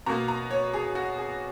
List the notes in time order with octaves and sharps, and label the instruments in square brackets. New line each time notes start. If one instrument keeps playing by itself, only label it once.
[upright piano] B2 A#3 A#5
A#5
C#5
G#4
F#4
G#4